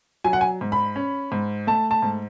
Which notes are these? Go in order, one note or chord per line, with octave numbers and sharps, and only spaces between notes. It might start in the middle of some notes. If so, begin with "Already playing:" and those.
F#3 G#5
F#5
G#5
G#2
B5
C#4
G#2
A3 A5
A5
G#2